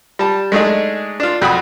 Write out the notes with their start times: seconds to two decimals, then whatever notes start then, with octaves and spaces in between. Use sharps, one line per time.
0.19 G3 A5
0.52 G#3 A3 D4 D#4 G#4
1.20 D4 F4
1.42 F2 F#4 B5 D#6